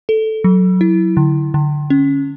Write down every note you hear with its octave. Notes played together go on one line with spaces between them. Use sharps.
A4
F#3
E4
D3
D3
C#4